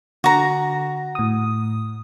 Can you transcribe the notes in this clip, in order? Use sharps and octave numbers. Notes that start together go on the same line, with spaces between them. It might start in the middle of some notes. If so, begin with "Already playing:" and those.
D3 F#4 A#5
A2 D#6